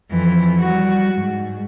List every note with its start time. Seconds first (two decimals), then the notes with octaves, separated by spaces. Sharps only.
0.11 F2 E3
0.60 G3 F#4
1.14 G#2